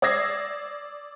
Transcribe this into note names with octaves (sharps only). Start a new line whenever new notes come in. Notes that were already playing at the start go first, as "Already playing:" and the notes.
D5 D#6 E6 G#6 A#6 C7